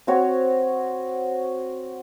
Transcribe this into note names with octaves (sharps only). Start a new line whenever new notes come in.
C4 F#4 C#5